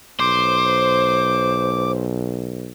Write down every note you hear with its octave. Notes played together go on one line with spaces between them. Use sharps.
B1 C5 D6